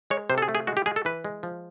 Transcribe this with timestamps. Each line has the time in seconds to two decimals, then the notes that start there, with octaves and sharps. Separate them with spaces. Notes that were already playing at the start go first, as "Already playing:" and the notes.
0.10 G#3 C#5
0.30 C3 C5
0.38 A4
0.42 G#4
0.49 A3
0.55 G#4
0.67 G#3 F#4
0.77 G4
0.86 G#3 G#4
0.96 A4
1.05 E3 B4
1.25 G#3
1.43 F3